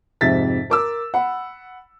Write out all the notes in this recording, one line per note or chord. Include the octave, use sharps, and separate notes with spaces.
F2 G#2 C3 E5 A6 B6
A#4 D6 E6
F#5 B5